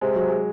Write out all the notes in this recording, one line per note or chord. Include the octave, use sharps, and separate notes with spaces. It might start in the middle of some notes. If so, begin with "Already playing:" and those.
C3 G#3
F#3
G#3